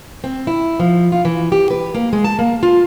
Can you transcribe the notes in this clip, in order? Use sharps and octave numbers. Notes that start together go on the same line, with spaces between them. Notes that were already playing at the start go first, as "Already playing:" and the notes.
C4
E4
F3
F4
E3
G4
B4
A#3
G#3
A5
A#3
F4